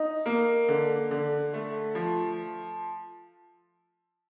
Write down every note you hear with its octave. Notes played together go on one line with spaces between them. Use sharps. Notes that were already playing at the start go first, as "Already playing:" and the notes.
Already playing: D#4
A#3
D3
D3
A3
F3